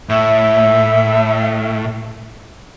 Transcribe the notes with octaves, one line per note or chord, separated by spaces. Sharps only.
A2 E5